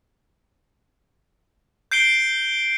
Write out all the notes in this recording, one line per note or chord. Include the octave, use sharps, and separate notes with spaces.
G6 C7 D7 G7